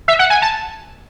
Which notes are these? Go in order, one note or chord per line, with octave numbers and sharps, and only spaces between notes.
E5
F#5
G#5
A5